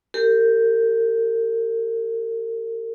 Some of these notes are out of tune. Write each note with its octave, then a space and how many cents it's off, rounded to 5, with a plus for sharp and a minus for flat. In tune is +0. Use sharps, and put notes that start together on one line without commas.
G4 +0 A#4 -40